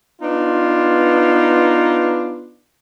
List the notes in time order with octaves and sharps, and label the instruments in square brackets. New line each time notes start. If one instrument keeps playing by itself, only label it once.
[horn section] B3 D4 D#4 F4 B4